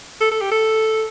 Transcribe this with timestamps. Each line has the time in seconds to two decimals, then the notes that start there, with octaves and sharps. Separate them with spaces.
0.21 A4
0.31 A4
0.41 G4
0.51 A4